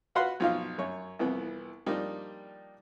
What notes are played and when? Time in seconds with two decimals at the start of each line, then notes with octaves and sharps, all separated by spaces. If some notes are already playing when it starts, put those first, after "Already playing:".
0.15 F4 F#4 B4 F5 F#5 C6
0.40 B1 F3 D#4 F4 F5
0.78 F#2 C#5
1.19 C2 F2 E3 B3
1.86 F3 G3 A#3 D4 D#4